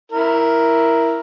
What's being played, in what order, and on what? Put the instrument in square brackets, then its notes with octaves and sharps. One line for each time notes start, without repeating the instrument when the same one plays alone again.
[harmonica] E4 A#4